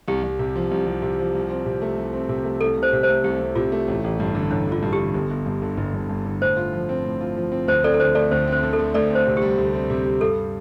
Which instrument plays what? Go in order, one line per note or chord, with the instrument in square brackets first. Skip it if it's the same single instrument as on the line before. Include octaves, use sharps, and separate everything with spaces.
[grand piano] C2 [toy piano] G4
[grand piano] C2
C3
F3
C2
C2
C3
F3
C2
C4
C3
A3
C2
C4
C3
A3
[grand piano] C2 [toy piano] A4
[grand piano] C2
[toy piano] C5
[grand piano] C3
[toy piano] C5
[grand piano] A3
[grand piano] C2 [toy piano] G4
[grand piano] C2
[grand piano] C3 [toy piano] F4
[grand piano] A3
A1
A1
G2
D3
[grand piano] A1 [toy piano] D4
[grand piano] A1
[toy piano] F4
[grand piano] G2
[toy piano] G4
[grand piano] D3
G1
G1
G2
D3
G1
G1
G2
D3
[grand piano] A2 [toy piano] C5
[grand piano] F4
F3
C4
A2
F4
F3
C4
[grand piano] D2 [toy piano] C5
[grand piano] C4 [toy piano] A4 D5
[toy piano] A4
[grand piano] D3 [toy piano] C5
[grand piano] A3 [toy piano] A4 D5
[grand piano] D2 [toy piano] C5
[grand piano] C4 [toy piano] C5
[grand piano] D3
[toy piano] A4
[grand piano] A3
[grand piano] D2 [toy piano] A4 D5
[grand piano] C4 [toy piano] C5
[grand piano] C3
[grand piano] G3 [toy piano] G4
[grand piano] D2
C4
C3
G3
[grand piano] G2 [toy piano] A4